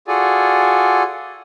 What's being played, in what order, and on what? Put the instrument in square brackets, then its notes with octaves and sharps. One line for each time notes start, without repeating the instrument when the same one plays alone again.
[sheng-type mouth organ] F4 F#4 G#4 A4 D5 G#5